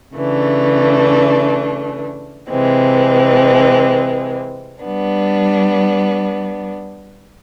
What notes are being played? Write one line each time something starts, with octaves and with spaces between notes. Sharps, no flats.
C#3 E3 A3 D4
C3 E3 G#3 C4
G3 B3 D4